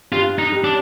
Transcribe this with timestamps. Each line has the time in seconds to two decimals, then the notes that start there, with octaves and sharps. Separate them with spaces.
0.12 G2 F4
0.39 D#4
0.52 G3
0.64 D4